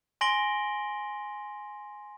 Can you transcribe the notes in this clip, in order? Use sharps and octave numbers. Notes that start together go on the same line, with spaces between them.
G#5 C6 A#6 D7 F#7 G7